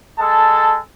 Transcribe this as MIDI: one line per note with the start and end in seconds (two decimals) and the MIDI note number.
0.19 0.80 56
0.19 0.80 69
0.19 0.80 81